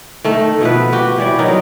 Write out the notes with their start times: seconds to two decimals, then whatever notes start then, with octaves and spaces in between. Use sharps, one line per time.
0.24 D#3 A3
0.61 B2 F3 B4
0.93 F#4 G4
1.18 E3 G3 D5
1.39 D#3 F#3 D#4 A#4